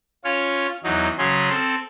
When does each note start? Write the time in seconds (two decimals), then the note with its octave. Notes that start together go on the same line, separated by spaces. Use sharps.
0.24 C#4 F4 C#5
0.84 E2 F#3 D#4
1.18 C#3 F#3 C#4 G#4 C6
1.49 C4 A4